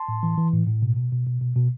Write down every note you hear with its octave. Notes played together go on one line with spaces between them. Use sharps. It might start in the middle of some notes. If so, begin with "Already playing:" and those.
Already playing: A5 C6
A2
E3
E3
A2
A2
B2
B2
B2
B2
B2
B2